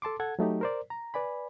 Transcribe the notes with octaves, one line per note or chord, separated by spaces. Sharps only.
A4 A5 C6 D6
A4 F#5 G#6
F#3 A3 D#4 G4
A#4 C5 D5
A#5
B4 D5 G#5 B5